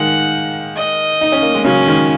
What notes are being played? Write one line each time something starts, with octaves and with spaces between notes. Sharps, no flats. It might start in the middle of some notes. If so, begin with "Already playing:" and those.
Already playing: D#3 G#3 A#3 F#5
D#5
D#4
C#4
A#3
G#3
C#3 F#3 C#4
D#3 G#3